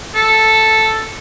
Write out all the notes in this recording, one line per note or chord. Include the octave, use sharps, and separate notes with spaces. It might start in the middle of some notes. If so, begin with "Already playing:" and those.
A4